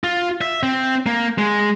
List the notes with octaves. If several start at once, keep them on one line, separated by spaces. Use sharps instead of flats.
F4
E5
C4
A#3
G#3